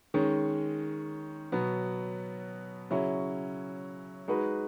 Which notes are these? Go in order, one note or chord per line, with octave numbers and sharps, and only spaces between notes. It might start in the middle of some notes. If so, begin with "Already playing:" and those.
D#3 G#3 C#4
B2 F#3 B3
C#3 F#3 C#4 E4
G#3 D#4 F#4 B4